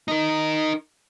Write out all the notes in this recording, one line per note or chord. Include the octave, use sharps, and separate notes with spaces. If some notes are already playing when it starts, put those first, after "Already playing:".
D#4 A#4